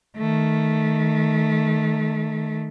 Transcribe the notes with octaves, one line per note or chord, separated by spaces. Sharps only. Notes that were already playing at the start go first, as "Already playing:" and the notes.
D#3 A3